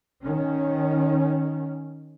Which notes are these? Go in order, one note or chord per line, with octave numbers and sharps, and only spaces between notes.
D#3 C#4